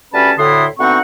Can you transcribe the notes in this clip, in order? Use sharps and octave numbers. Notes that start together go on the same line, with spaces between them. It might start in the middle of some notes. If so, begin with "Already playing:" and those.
D2 G3 C#4 B4 A5 B5
D2 A2 D3 E4 C6 D#6
D2 B3 C4 D#4 F#5 C#6